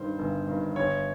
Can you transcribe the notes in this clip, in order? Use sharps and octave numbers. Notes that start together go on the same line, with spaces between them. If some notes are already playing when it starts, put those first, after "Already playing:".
Already playing: G2 D#3 C5
G1
G2 D#3
G1 C#5